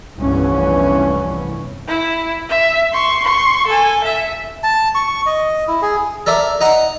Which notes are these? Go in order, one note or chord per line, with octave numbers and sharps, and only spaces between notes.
F1 C2 G2 E3 B3 C#4
E4
E5
C6 C#6
C6 C#6
A4 G#5
E5
A5
C#6
D#5
E4
G#4
A4 A#4 D5 E5
D#4 F#5 A#5